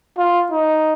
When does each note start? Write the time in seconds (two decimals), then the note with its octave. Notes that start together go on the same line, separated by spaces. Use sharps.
0.18 F4
0.51 D#4